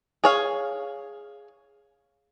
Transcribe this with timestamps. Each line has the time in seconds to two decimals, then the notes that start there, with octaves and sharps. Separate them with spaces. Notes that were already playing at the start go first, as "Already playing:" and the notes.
0.24 G#4 C#5 F5